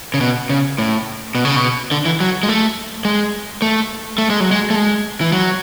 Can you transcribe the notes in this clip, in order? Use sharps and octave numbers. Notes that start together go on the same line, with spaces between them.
C#3
B2
C#3
A2
B2
C#3
B2
D3
E3
F#3
G#3
A3
G#3
A3
A3
G#3
F#3
G#3
A3
G#3
E3
F#3